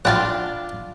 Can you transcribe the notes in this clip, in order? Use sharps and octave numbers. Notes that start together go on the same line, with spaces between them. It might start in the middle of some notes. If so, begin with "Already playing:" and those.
D4 F4 F#5 G5 A5